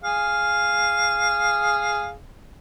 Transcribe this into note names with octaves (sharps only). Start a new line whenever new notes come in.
G#4 F5